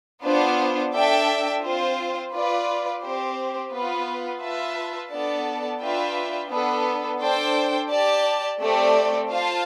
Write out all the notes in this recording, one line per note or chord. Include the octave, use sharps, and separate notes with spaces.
B3 D4 F4 C5
D4 A4 E5 G5
C4 F4 C5
F4 B4 D5
C4 G4 C5
B3 F4 B4
F4 B4 E5 A5
B3 D4 A4 D5 A5
D4 F4 B4 E5 G5
B3 D4 A4
D4 A4 C5 G5
G4 D5 A5
A3 C4 G4 D5
F4 C5 F5 A5